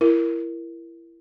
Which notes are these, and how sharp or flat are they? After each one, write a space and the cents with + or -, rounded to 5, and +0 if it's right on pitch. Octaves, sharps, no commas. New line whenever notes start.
E4 +25 A#4 +0